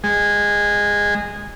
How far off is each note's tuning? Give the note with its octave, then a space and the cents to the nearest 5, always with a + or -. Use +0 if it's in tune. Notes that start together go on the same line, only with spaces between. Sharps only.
G#3 -15